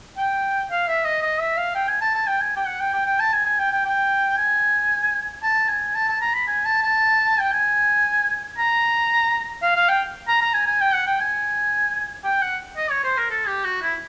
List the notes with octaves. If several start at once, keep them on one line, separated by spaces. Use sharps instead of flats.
G5
F5
E5
D#5
D#5
E5
F5
G5
G#5
A5
A5
G5
G#5
G5
F#5
G5
G5
G5
A5
G#5
G#5
G5
G5
G5
G#5
A5
G#5
A5
A5
A#5
B5
G#5
A5
A5
G5
G#5
A#5
F5
F5
G5
A#5
A#5
G#5
G#5
G5
F#5
G5
G#5
G5
F#5
D#5
C#5
C5
A#4
A4
G4
F#4
E4